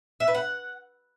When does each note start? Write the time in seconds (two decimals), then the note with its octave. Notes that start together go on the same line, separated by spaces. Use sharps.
0.20 E5
0.27 B4
0.34 F#5